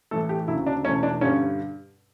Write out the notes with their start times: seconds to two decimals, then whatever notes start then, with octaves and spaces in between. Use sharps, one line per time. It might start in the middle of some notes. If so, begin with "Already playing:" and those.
0.11 A2 E3 A3 A4
0.29 G4
0.48 D2 C#3 F#3 E4
0.66 D4
0.84 E2 B2 A3 C#4
1.03 D4
1.21 G2 D3 G3 C#4